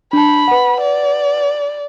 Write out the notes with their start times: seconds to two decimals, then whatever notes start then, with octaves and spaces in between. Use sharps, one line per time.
0.13 D4 A5 B5
0.48 B4 F#5
0.80 D5